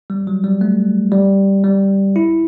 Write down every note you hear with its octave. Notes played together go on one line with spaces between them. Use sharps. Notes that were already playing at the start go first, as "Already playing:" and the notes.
G3
F#3
G3
A3
G3
G3
E4